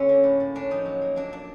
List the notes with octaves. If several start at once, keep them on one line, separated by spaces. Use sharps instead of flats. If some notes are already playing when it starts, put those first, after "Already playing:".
Already playing: D3 C#4
A#3
A2
A2
C#4 D4
F3 D#4
F#3
A#3
A#3 D4
A#3 D4